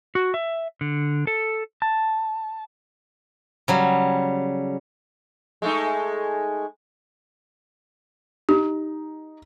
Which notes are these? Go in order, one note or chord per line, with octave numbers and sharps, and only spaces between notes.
F#4
E5
D3
A4
A5
C#3 F#3 G3
G#3 A3 D#4
D#4 G4